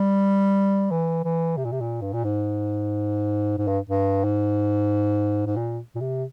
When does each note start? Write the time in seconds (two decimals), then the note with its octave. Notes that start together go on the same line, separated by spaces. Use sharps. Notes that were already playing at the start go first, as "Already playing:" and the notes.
Already playing: G3
0.91 E3
1.25 E3
1.58 C3
1.65 A#2
1.72 C3
1.81 A#2
2.02 G2
2.14 A#2
2.24 G#2
3.58 G#2
3.68 G2
3.89 G2
4.24 G#2
5.46 G#2
5.57 A#2
5.95 A#2
6.01 C3